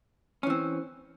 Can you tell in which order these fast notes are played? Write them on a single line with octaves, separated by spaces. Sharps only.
C#4 E3 C4